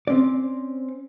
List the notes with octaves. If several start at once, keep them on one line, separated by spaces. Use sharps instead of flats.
C4 C#4 D5